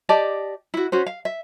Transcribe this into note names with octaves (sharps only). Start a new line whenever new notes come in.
G4 D5 D#5 A5
E4 F#4
C#4 F#4 C5
F5
E5